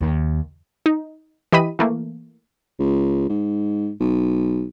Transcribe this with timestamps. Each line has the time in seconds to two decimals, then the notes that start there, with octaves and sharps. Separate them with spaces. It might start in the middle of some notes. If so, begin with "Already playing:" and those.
0.01 D#2
0.86 D#4
1.52 E3 G4 D#5 B5 B6 D#7
1.79 E3 A3 A#3
2.79 C#2
3.30 G#2
4.00 B1